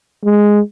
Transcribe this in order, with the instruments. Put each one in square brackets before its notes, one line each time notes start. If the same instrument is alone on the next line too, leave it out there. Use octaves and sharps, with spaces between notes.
[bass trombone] G#3